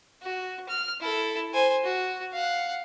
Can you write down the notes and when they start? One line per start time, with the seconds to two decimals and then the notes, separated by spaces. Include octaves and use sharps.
0.22 F#4
0.69 F6
1.00 E4 A4
1.53 C5 G#5
1.84 F#4
2.33 F5 F#5